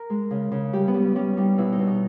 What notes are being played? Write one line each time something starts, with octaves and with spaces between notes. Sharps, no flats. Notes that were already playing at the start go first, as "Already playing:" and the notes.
Already playing: A#4
G#3
C#3
C#3
G3 G4
B3
G3
C#4
G3 C#4
G3 D#4
B2 E4
D#4
B2
D#4